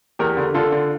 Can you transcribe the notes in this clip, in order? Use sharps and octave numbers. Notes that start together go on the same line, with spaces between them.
E2 G4 A#4
D3
D3 F4 A4
D3